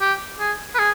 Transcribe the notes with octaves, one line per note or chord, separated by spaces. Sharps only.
G4
G#4
B4
G#4